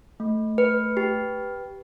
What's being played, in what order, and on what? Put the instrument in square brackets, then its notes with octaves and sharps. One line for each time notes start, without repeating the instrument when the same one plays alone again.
[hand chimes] A3
B4
G4